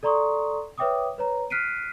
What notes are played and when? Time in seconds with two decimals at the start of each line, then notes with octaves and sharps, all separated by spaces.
0.03 A4 D5 A#5 C6 C#6 D#6
0.78 B4 C#5 E5 G5 D6 D#6
1.18 B4 C#5 A#5
1.50 F6 F#6 B6 C7 D7 D#7